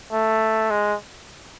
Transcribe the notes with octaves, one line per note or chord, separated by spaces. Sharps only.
A3
G#3